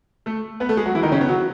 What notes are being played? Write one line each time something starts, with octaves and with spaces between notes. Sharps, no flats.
A3 A4
B3 B4
A3 A4
G#3 G#4
F#3 F#4
E3 E4
D#3 D#4
C#3 C#4
B3
F#3 F#4